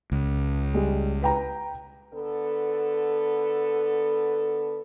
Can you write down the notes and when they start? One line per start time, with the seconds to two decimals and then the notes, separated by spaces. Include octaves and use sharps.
0.12 C#2
0.74 G3 G#3
1.22 B4 G5 A#5
2.14 D3 B3 A4